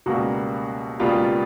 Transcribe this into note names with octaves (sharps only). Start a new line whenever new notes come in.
C#2 B2 G3 A#3 F#4
C#2 B2 G3 A#3 F4